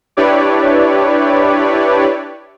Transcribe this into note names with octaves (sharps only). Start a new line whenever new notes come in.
D4 E4 G4 B4 C#5 D5